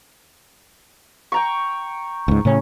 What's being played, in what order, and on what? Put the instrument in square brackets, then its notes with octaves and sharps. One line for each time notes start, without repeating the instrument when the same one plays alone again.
[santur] G5 A#5 C#6
[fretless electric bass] C#2 G#2
A2 C#3 C#4